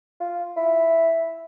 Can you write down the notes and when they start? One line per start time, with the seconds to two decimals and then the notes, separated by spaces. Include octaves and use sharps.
0.20 F4
0.56 E4